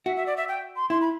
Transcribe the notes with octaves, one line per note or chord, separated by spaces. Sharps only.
F#4 E5
E5
D5
E5
G5
C6
E4 C6
B5